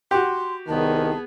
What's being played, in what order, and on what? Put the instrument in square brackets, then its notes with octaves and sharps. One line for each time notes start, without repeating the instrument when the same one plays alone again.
[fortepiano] F#4 G4 [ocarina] C6
[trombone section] C2 D#3 [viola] B3 G#4 [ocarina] A5